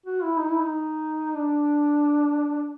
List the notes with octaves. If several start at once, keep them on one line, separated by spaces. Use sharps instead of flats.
F#4
E4
D#4
E4
D#4
D4